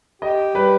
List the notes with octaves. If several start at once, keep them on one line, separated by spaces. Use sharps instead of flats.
G4 D#5
G3 B4